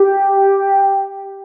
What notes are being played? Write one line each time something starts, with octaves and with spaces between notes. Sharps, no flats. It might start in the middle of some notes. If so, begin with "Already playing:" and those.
Already playing: G4